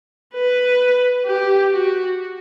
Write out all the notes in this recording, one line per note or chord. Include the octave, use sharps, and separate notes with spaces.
B4
G4
F#4